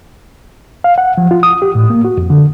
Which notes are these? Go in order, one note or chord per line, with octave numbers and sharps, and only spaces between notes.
F5
F#5
F3
F4
D#6
G4
A2
A#3
F#4
F2
D3